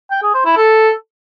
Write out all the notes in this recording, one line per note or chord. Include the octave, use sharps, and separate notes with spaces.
G5
G#4
C5
E4
A4